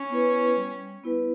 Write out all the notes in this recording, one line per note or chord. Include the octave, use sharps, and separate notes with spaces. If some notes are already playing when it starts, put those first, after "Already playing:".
Already playing: C#4
B3 E4 B4
G3
B3 E4 B4